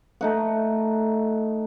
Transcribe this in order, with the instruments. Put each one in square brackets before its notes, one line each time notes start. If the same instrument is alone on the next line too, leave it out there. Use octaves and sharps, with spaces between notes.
[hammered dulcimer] A3 D#4 F#5